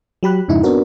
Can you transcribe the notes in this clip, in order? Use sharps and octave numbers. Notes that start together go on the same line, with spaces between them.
F#3 G4 B5 F#6
F2 G#2 C#3 D#4 E4
B3 C4 D4 F#4 A#4